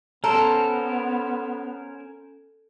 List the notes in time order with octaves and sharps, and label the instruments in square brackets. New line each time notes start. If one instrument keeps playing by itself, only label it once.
[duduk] B3 [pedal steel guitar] C#4 A#4 C5 [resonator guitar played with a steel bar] A4 [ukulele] A#5